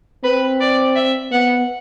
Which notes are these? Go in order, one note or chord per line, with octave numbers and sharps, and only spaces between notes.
C4 B4
D5
E5
B3 F#5